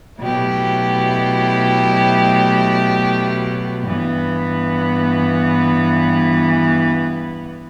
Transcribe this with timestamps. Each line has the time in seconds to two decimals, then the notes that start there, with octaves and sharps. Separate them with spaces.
0.20 B2 F#3 A3 E4 G4
3.86 G2 E3 B3